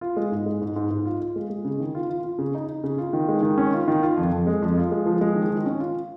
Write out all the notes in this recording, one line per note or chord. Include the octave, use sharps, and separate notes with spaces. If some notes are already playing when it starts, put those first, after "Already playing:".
F4
G#3
G#2
G#3
G#2
G#2
G#2
F4
F4
G#3
G#3
C#3
D#3
F4
F4
F4
C#3
D#4
D#4
C#3
F4
D#3
G#3
D#3
C#4
F4
D#3
F4
F2
F2
G#3
F2
F4
G#3
F3
G#3
D#3
D#3
C#4
F4